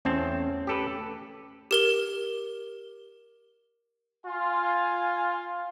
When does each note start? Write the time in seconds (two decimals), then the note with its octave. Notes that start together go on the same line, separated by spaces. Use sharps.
0.05 E2 A3 C4 C#4 A5
0.67 G4 A4 B4
1.71 G4 A#4 G7
4.26 F4 G#5